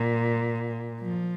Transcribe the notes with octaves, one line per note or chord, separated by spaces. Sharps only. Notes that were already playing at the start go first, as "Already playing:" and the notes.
Already playing: A#2
F3